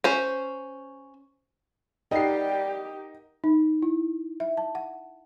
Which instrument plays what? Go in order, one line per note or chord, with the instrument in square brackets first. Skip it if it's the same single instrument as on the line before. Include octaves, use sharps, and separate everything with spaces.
[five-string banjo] C#4 C5
[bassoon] G3 [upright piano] D#4 C7 [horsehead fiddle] G4 [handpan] A#4 D#5 F#5
[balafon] D#4
E4
E5
A5
F#5